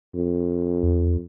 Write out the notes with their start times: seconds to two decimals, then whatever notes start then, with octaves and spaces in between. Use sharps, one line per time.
0.15 F2
0.83 E2